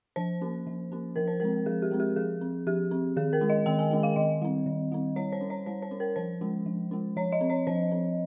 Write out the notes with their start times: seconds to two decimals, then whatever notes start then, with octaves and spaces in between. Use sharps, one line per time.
0.16 F3 C5
0.41 A#3 C#4
0.67 F3
0.92 A#3 C#4
1.16 F3 A#4
1.28 C5
1.40 G#3 C4 A#4
1.66 F3 G#4
1.82 G4
1.91 G#3 C4
2.00 G4
2.16 F3 G#4
2.41 C4
2.67 F3 G4
2.91 C4
3.16 D#3 G#4
3.33 A#4
3.41 G#3 C#4
3.50 D#5
3.66 D#3 G5
3.79 G#5
3.91 G#3 C#4
4.03 F5
4.16 D#3 D#5
4.42 G3 C4
4.66 D#3
4.92 G3 C4
5.16 G3 C#5
5.32 C5
5.41 C#4
5.50 C#5
5.66 G3 C5
5.82 C5
5.91 C#4
6.00 A#4
6.16 F3 C5
6.41 G#3 C#4
6.66 F3
6.91 G#3 C#4
7.16 F3 C#5
7.32 D#5
7.41 C4
7.50 C#5
7.67 F3 C5
7.92 C4